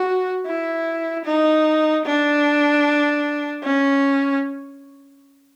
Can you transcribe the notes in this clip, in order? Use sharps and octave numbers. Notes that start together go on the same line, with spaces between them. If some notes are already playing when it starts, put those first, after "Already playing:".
Already playing: F#4
E4
D#4
D4
C#4